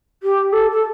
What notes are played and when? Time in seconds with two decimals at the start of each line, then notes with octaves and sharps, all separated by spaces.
0.23 G4
0.53 A4
0.71 A4